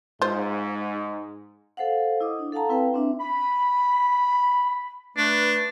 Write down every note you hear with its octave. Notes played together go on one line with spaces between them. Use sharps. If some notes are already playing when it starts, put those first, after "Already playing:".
G#2 F4 C5
A4 C5 F5 F#5
E4 D#5 D6 D#6
D4
A4 F5 F#5 A5 A#5
C4 E4 B4 F5 G5
C4 D4 E5
B5
A3 D4 B4